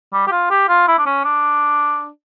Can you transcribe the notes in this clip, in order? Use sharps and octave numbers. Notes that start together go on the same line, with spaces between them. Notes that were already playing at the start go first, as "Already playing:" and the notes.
G3
G4
F4
G4
F4
E4
D4
C#4
D4